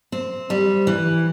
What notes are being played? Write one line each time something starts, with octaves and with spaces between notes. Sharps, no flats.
C4
G3
E3